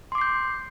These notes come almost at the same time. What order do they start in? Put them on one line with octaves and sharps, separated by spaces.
C6 D6 C7 G6